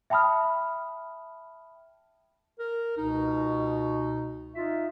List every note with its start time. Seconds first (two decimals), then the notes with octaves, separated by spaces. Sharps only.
0.10 E5 G5 A5 B5 D#6 F6
2.59 A#4
2.98 C#2 B2 D#4
4.55 D#4 F4 E5